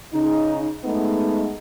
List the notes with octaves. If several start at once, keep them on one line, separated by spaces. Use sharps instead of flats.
C#3 D#4
G#3 A3 B3 D#4